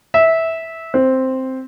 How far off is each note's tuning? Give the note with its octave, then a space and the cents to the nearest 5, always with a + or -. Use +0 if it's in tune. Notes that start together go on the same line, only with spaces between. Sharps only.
E5 -15
C4 +0